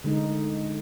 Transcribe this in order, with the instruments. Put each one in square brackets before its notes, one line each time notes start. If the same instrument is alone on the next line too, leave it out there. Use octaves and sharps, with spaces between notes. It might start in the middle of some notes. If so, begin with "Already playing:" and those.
[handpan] D3 G#3 D#4